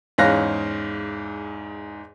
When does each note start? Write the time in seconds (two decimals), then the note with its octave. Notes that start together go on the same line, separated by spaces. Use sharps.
0.18 E2 G#2 C#4 F5 F#6 A#6